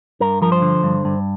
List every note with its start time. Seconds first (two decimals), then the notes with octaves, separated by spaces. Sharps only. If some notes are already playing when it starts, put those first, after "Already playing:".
0.20 G2 A#4
0.42 F3 A#4
0.52 C5
0.62 D3
0.83 G2
1.05 G2